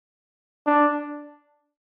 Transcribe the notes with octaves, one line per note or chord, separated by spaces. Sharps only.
D4